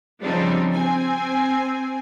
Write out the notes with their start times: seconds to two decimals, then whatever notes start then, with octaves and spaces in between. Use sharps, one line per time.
0.21 C#3 F3 G3 C4 D4 D#4
0.72 C4 G#5